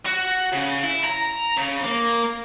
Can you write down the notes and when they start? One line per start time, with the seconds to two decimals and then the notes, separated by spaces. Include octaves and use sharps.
0.06 F#4
0.53 C#3
0.83 E4
1.04 A#5
1.57 C#3
1.84 A#3